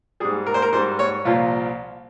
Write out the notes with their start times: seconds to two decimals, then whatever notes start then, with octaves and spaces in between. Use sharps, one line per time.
0.20 G3 G#4
0.25 G#2
0.46 A#4
0.54 C5
0.62 A#4
0.72 G#2 G3 C5
0.99 C#5
1.25 C2 A#2 F3 F4